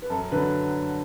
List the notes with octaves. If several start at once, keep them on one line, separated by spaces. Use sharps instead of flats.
B4
F#2 A4
D3 F#3 B4